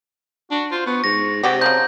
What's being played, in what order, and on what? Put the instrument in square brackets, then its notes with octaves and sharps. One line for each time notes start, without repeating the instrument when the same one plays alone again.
[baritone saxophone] D4 [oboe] F#4
[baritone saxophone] F4 [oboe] C5
[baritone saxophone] B3 [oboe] C#6
[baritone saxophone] G#2 [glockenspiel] A#6
[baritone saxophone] C3 [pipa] F#4 G4 [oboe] D6
[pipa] C#3 F3 G#3 [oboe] A#5 [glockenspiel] G6